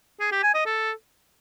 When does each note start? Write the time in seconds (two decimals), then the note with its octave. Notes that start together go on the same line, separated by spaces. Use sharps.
0.20 G#4
0.32 G4
0.43 G#5
0.55 D#5
0.66 A4